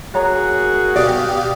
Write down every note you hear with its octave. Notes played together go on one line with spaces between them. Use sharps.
A#3 F#4 G#4 C#5 A#5
B2 G4 D5 F5 D#6